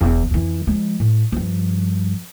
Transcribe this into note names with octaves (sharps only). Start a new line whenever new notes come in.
E1 E2
F2 E3
F3 G#3
A2
G2 F3